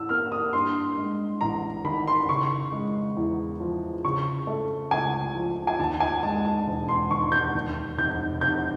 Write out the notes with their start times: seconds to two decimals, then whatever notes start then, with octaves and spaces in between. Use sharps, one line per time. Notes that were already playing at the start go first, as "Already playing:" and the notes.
Already playing: A2 E6
0.09 A#3 F6
0.32 D#6
0.53 G2 C6
0.97 G#3
1.41 A1 A#5
1.84 D#3 B5
2.07 C6
2.28 C#3 C#6
2.72 G#3
3.17 E2
3.60 F3
4.05 C#3 C#6
4.47 A3
4.91 C#2 G#5
5.35 F3
5.67 G#5
5.79 D#2 A5
6.00 G#5
6.23 G#3 A5
6.45 A5
6.67 E1
6.89 C6
7.10 D#3 C#6
7.32 G6
7.55 D#2
7.98 F1 G6
8.41 F1 G6